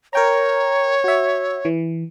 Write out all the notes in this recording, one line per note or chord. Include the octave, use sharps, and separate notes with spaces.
A#4 C#5 G5 A#5
F#4 E5
E3